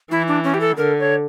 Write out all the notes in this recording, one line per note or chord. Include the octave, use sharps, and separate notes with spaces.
E3 E4
D4
C#4
G4
A4
D3 A#4
C#5